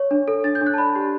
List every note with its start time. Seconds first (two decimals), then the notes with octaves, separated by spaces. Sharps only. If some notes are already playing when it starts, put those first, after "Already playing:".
Already playing: C#5
0.11 D4
0.28 A4
0.44 D4 A6
0.55 G6
0.61 D4
0.67 F#6
0.74 A5
0.78 D5 B5
0.96 G4